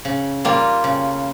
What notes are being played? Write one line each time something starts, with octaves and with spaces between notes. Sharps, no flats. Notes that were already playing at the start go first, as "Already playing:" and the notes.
C#3
G3 A#3 F4
C#3